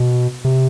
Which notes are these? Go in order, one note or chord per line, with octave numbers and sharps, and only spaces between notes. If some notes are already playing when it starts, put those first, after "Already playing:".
Already playing: B2
C3